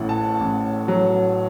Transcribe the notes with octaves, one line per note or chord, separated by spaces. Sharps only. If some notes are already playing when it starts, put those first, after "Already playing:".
Already playing: A1 A2 F#5
A5
A1
F#3